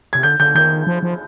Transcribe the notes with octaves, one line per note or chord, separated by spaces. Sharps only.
C3 G#6
D3 G6
D3 G6
D#3 G6
F3
F3